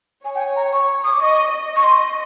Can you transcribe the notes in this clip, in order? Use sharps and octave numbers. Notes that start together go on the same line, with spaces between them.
C#5 G#5
G5
G#5
A#5
C#6
D#6
D6
D#5 C#6
D#5
C#6
C6